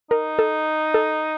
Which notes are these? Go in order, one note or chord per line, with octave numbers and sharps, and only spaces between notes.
D#4 A#4
A4
A4